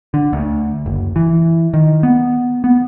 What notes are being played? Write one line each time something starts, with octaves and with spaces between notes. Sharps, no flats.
D3
D2
F#1
E3
D#3
B3
B3